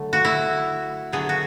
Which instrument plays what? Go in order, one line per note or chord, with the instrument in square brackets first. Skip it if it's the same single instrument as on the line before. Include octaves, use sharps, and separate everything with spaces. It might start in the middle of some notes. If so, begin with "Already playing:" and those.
Already playing: [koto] D3 F#3 A3
F#4
E4
D3 F#3 B3 G#4
F#4